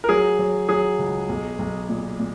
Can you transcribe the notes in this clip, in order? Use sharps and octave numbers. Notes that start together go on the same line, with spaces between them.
A#4
F#3 G#4
F#3
F#3 G#4
C#2
B1
B1
A#2
A#2